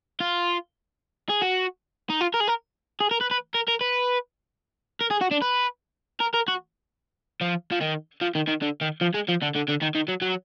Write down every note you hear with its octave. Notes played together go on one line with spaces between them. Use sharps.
F4
G#4
F#4
D#4
F4
A#4
G#4
A#4
G#4
A#4
B4
B4
A#4
A#4
B4
A#4
G#4
F#4
D4
B4
A#4
A#4
F#4
F3
F3
D#3
F3
D#3
D#3
D3
D#3
F3
G#3
F3
D3
D3
D3
D#3
D#3
F#3
F#3